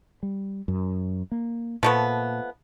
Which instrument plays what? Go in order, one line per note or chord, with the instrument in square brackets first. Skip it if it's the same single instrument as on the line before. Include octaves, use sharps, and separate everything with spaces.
[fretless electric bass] G3
F#2
A#3
[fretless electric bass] A#2 [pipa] F3 A3 B3